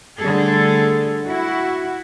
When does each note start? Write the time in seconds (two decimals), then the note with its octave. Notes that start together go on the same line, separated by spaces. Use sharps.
0.21 D3 G3 A3 G#4 A4
1.26 E4 F#4